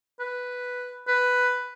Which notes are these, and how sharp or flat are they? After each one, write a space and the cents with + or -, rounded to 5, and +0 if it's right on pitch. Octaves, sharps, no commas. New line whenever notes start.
B4 +0
B4 +5